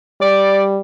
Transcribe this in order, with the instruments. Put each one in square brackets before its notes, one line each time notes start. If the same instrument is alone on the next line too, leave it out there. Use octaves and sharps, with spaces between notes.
[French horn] G3 [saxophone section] D5